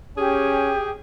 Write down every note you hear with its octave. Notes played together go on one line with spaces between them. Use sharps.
C#4 G4 G#4